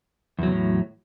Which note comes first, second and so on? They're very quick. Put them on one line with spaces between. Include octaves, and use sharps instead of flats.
E2 F#3 C3 A2